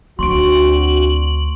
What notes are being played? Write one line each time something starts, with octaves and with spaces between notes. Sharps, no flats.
D2 C4 D4 F#4 C6 C#6 D7 F#7